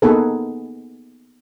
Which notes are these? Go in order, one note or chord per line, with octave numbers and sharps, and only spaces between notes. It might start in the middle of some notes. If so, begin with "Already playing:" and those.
A#3 B3 D#4 G#4 A4 B4